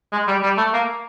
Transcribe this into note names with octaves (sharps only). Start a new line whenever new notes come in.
G#3
G3
G3
A3
A#3